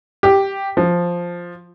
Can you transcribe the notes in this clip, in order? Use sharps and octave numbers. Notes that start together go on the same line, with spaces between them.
G4
F3